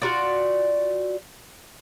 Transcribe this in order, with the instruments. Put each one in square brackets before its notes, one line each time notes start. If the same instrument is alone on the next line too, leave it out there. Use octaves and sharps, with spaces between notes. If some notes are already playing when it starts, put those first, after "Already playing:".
[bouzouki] F4 F#4 D5